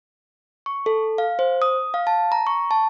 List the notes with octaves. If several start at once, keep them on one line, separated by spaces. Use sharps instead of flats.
C#6
A4
F5
C5
D#6
F5
A5
A#5
C#6
A5